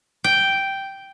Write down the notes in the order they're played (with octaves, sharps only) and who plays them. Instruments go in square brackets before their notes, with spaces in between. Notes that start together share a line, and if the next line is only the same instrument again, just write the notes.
[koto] G5